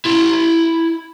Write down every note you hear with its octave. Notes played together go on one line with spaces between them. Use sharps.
E4 C6